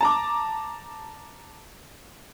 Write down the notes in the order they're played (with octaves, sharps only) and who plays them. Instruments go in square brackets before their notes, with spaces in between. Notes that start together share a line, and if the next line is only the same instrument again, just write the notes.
[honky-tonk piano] A5 A#5 D6